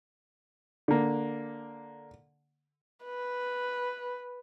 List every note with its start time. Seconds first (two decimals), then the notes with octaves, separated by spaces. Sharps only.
0.88 D3 A#3
3.05 B4